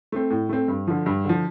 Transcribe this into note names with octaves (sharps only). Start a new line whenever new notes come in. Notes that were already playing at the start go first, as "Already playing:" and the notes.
A3 C4
A2
A3 C4
G2
D3 F3
G2
D3 F3